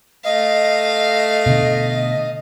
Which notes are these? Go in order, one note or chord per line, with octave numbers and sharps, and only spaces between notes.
A3 D#5 F5
B2 D3